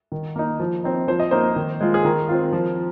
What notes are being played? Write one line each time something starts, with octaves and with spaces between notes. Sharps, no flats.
D#3
A#3 D#4
F3
C4 D#4
F3 C5
D#5
A#3 D#4 C5
D#3
G#3 F4
G#4
D#3 A#4
C4 F4
F3